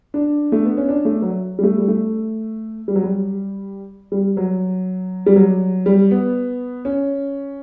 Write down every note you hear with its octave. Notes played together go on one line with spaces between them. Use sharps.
D4
A3
B3
C#4
D4
A3
F#3
G3
A3
G3
A3
G3
F#3
G3
G3
F#3
G3
F#3
G3
B3
C#4